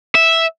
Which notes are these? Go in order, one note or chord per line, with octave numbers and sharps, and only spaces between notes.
E5